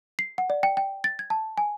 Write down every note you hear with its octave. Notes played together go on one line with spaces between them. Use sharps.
C7
F#5
D5
G5
G5
A6
G#6
A5
G#5